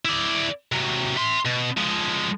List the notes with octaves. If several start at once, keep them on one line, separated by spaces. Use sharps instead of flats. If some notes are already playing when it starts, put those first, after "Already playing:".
E4 D5
C3 F#3
E5 C6
B2
F3 G#3